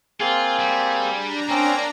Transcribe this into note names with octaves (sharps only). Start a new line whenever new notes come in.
A#3 C4 F4 G#4
G3
D4 A#5
A#3 C4 C#4